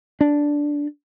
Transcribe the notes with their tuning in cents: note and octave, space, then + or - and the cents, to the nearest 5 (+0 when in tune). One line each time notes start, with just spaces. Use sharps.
D4 -5